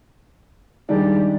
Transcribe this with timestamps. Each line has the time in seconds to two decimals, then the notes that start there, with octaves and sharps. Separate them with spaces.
0.89 D#3 G3 G#3 D4